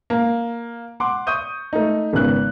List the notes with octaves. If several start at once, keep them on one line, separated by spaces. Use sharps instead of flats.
A#3
F#5 C6 D6
C#6 D#6 G6 D#7
A3 D#4
G#1 C#3 B3 F#6